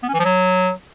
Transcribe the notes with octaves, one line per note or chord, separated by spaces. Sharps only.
B3
C#4
E3
F3
F#3